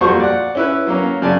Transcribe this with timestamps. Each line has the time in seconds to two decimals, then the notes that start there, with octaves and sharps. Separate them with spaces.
0.01 F2 A#2 G3 F#4 C5 C#6
0.20 D5 F#5
0.55 C#4 E4 B4
0.87 F#3 A#3 C#4
1.22 F#2 C#3 D5 G#5 A5